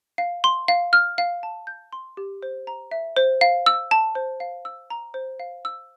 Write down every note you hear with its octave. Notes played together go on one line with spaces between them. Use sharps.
F5
C6
F5
F6
F5
A5
G6
C6
G4
C5
A#5
E5
C5
F5
E6
A5
C5
F5
E6
A#5
C5
F5
E6